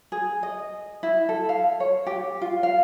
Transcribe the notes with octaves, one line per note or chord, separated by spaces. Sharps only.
G#4
D#5
E4
A4
F5
C#5
G4
F4
F5